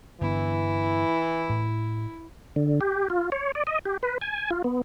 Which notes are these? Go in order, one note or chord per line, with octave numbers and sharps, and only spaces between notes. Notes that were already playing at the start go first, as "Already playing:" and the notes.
G2 D3 E3 B3 E4
A2
D3
G4
F4
C#5
D5
D#5
G4
B4
G#5
F4
B3